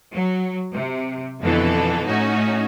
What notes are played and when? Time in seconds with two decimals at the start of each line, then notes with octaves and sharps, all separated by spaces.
0.13 F#3
0.73 C3
1.40 F2 B2 D3 E3 A4
2.06 A2 A3 C#4 D#4 F#4